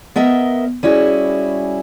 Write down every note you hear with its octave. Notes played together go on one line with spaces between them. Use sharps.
B3 A#4 D#5 E5
G3 C#4 E4 F#4 G#4